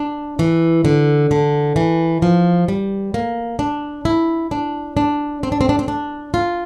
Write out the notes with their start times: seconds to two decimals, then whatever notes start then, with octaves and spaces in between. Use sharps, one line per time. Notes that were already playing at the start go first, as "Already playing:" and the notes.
Already playing: D4
0.39 E3
0.85 D3
1.31 D3
1.76 E3
2.22 F3
2.68 G3
3.14 A#3
3.59 D4
4.05 E4
4.51 D4
4.97 D4
5.43 C4
5.52 D4
5.61 C4
5.69 D4
5.79 C4
5.88 D4
6.34 F4